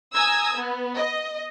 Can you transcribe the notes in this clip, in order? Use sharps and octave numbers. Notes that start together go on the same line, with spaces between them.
G#5 A#5 D#6 E6 G#6
B3
D#5